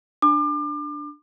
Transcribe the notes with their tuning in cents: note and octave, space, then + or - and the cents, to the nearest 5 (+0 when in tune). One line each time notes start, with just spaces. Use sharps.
D4 +5 D6 +35